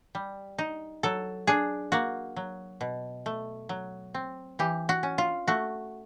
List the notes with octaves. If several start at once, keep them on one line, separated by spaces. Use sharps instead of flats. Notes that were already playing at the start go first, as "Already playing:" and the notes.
G3
D#4
F#3 A4
D4 G#4
A#3 F#4
F#3
B2
A3
F#3
C4
E3 G4
F#4
C#4
F4
A3 F#4